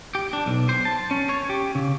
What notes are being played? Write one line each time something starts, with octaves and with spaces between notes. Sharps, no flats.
G4
D4
B1
C5
A5
C#4
C#5
G4
C#3